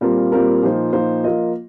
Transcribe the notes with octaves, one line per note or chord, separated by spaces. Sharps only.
A#2 G3 C4 F4 A#4
A#2 G3 C4 F4 A#4
A#2 F3 D#4 C5
A#2 F3 D#4 C5
F3 A#3 F4 D#5